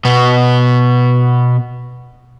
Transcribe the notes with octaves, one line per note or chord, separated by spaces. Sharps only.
B2 B3